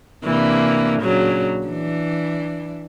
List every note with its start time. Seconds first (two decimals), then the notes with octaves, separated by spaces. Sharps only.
0.25 C3 E3 A#3 D4
1.03 A#2 C#3 F#3 D4
1.67 E3 D4